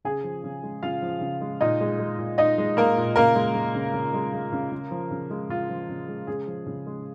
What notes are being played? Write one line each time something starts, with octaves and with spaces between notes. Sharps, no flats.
C#3 G#4 G#5
F3
C#3
G#3
C#3 F4 F5
F3
C#3
G#3
A#2 D#4 D#5
G#3
G#3
A#2
A#2 D#4 D#5
G#3
G#3 A#3 A#4
A#2
C#3 A#3 A#4
G#3
G#3
C#3
C#3
G#3
G#3
C#3
C#3
F3
C#3
G#3
C#3 F4
F3
C#3
G#3
C#3 G#4
F3
C#3
G#3